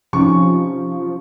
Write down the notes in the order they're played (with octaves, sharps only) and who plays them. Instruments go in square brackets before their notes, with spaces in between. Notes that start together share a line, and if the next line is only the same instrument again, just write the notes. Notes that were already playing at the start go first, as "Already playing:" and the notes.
[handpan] C3 C#4 D#4 [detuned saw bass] F3 [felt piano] C#6